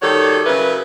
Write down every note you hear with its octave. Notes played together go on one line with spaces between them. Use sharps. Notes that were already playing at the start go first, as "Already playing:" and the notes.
D#3 G3 F#4 A4 C#5
C#3 F#3 E4 A#4 B4